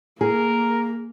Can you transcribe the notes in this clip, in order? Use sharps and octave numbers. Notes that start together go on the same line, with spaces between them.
A#3 G#4 A#4